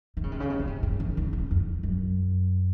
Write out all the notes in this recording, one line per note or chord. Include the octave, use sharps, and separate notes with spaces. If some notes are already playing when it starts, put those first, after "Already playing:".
D#3
C#3
C3
C#3
C3
C#3
C3
C#3
D#3
C#3
C#3
F2
F#2